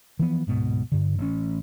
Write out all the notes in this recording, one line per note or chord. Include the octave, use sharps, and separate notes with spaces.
E3 F3 B3
D1 G#2 B2
G2 D3
A1 C#4